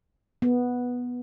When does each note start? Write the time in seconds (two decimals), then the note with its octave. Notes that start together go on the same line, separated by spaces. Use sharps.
0.42 B3